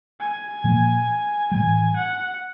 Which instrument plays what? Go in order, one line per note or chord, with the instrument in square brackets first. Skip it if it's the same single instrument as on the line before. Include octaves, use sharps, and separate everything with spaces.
[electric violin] G#5
[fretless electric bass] A#2 F3 A#3
[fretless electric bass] A2 E3 G3 [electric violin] G#5
[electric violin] F#5